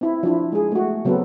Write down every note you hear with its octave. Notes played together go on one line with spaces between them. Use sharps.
C4 E4
F3 D4 E4
G#3 G#4
A3 F#4
C#3 F#3 B3 C4 A4 B4